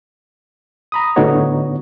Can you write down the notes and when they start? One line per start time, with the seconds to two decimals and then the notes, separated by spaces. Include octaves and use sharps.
0.92 A#5 B5 D#6
1.16 A2 D3 B3 D#4 F#4 C#5